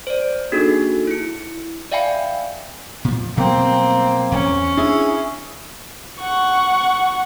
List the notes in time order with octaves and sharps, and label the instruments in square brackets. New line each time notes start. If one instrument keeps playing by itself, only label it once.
[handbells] C5 D5
A#3 D4 D#4 F#4 G#4 A4
E4 C#7
D5 E5 F5 G5 G#5 B5
[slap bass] A#2 F3
[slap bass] B2 F#3 G3 [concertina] A#3 [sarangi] C4
[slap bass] E2 [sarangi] C#4
[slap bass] D4 [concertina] E4 G#4
[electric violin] F#5 C#6